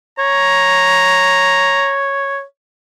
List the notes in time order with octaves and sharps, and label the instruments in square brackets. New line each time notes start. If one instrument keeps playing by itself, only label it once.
[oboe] C#5 [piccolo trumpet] A#5